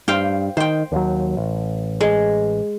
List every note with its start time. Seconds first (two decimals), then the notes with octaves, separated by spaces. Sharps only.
0.08 G2 C5 F5 G5
0.57 D#3 C5 G5
0.92 D#2 F#3
1.37 A1
2.01 G#3